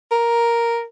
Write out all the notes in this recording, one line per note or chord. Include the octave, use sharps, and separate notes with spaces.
A#4